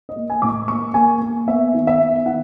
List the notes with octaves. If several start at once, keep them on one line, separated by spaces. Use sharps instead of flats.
D#5
A#3
G#5
A2 D6
C#6
A#3 C#6
A#3 G#5
A#3
B3 E5
D#3
E5
B3
D#3 F#5